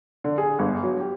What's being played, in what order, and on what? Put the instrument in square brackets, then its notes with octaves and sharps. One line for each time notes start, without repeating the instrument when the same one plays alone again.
[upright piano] D3
G#4
G1
F#3
G4